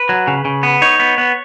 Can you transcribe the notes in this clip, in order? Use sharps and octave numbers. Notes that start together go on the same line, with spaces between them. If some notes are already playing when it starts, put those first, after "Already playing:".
Already playing: B4
F#3
C#3
C#3
B3
D#4 C#5
B3
B3